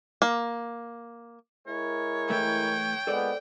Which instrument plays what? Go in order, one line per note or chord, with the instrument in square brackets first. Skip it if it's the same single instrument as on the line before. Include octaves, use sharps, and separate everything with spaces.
[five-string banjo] A#3
[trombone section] G#3 E4 A#4 [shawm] C#5
[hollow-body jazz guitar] E3 A3 [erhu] G5
[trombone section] A#2 G#3 B3 [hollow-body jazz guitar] A4 C5 D5